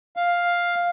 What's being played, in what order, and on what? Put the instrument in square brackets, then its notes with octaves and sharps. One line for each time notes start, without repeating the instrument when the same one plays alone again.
[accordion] F5